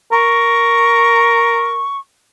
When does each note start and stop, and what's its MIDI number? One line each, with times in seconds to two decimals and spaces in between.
0.12 1.81 70
0.12 1.97 85